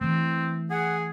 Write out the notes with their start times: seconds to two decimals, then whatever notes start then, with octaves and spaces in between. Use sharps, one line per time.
0.01 E3 A3 C4
0.71 G#4 F#5